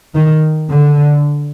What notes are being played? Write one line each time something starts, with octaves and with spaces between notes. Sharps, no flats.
D#3
D3